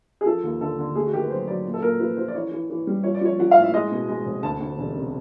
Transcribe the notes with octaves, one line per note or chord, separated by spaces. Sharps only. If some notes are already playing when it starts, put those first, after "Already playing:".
G#4
F3 A4
D#2
D3 A4
D3
A3 G#4
F#4
D#3 G4
B4
F#3 C5
F#3 D5
A#2
A4
A#2 A#4
F3 B4
F3 C5
D5
E3 C#5
E3
E3
G3
F3 C#5
D5
F3 C#5
F3 F#5
F5
A2
E5
G#3 D#5
B2
G#3
F1
D2 A5
D2
E1
C3